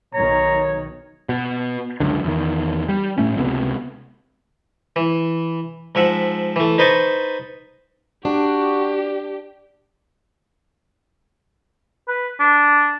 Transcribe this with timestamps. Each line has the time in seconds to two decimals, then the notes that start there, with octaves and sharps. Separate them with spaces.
0.14 B1 D#3 C#5 A#5
1.29 B2
2.00 C#2 F#2 D3
2.24 E2 D#3
2.89 G3
3.18 A2 A3 C#4
3.37 C#2 C3 D#3 B3
4.96 E3
5.95 G#2 F3 E5 F#5
6.56 E3 A3
6.78 D#4 B4 C5 D#5 A5 C#6
8.25 D4 F#4 G4
12.08 B4
12.40 D4